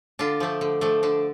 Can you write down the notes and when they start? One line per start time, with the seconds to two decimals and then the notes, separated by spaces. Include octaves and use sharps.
0.19 D3 D4 F4
0.40 F3 A3 D4
0.61 D3
0.81 F3 A3 D4
1.03 D3 D4